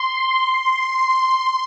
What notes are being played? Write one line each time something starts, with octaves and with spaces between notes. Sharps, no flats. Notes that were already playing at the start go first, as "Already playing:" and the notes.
Already playing: C6